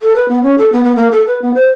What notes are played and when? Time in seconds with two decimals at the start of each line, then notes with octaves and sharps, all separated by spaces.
0.01 A4
0.16 B4
0.28 B3
0.43 C#4
0.58 A4
0.72 B3
0.84 B3
0.96 A#3
1.11 A4
1.27 B4
1.42 B3
1.54 C5